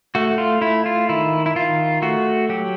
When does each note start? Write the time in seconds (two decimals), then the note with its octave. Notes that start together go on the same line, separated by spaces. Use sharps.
0.15 A3 F#4
0.38 F4
0.61 A3 E4
0.86 F4
1.09 D#3 E4
1.46 E4
1.55 D#3 F4
2.02 A3 F#4
2.49 F#3 G4